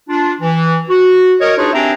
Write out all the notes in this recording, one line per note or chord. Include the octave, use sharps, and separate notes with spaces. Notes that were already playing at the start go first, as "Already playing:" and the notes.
D4 F4
E3
F#4
A#4 C#5 D#5
D4 D#4 F4 G#4 B4 C#5
C4 D4 G4 E5 G#5 A#5